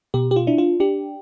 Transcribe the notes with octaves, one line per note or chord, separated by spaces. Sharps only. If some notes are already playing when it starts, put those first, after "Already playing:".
B2 G4
G4
F4
D4 E4
F4
D4 G4